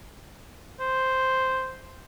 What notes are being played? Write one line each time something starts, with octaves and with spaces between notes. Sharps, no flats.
C5